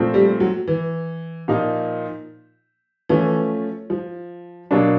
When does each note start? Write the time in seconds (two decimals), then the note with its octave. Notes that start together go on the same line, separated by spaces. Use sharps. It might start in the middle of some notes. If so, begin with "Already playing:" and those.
Already playing: A#2 F3 A3 C4
0.14 G3
0.40 F#3
0.67 E3
1.48 A#2 F3 A#3 D#4
3.09 E3 F3 A3 C#4
3.90 F3
4.71 B2 F#3 A#3 D4